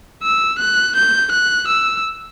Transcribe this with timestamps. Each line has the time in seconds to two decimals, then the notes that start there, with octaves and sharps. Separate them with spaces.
0.23 E6
0.59 F#6
0.96 G6
1.32 F#6
1.68 E6